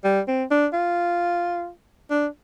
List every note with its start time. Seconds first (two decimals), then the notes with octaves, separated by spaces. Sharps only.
0.04 G3
0.28 C4
0.51 D4
0.73 F4
2.10 D4